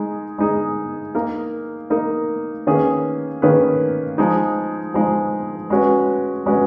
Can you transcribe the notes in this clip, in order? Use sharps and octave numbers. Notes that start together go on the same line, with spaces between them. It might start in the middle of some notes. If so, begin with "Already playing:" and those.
Already playing: G#3 D#4 G#4
G#3 D#4 G#4
A#3 D#4 A#4
A#3 D#4 A#4
D#3 A#3 C#4 G#4 B4
D#3 A#3 C#4 G#4 B4
F3 G#3 D#4
F3 G#3 D#4
G#3 C#4 F#4 B4
G#3 C#4 F#4 B4